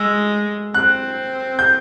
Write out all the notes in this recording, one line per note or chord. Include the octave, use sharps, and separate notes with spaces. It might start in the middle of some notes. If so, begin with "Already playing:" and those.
Already playing: G#3 E6
C4 F#6
G6